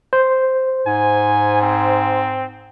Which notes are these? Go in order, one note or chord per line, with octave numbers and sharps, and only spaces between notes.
C5
G#2 G#5
C4